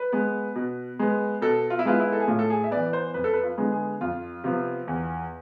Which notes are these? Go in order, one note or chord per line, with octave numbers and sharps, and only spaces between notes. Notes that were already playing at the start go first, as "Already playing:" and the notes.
Already playing: B4
G#3 B3
B2
G#3 B3
B2 A4
F4
E4
G#3 B3 F4
E4
A4
G#4
A2 F4
A4
G#4
E5
E3 B3 D5
C5
F2 B4
A4
B4
F4
D3 G#3 B3
G#4
F2 F4
C3 F3 B3
E2